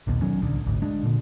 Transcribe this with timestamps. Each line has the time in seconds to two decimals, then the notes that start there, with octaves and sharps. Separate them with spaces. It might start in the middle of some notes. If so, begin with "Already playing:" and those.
0.07 A#1 D#2 B2
0.22 B2 D#3 F#3 C#4
0.40 D1 C2 D3
0.66 G#1 D2
0.82 G#3 D4
1.03 A#2 D3